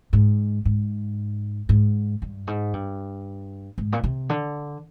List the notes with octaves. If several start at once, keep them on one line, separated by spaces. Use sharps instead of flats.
G#2
G#2
G#2
G2
G#2
G2
G#2
A#2
C3
D3